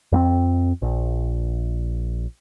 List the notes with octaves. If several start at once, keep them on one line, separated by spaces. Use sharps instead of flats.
F2 A#3 C4
A#1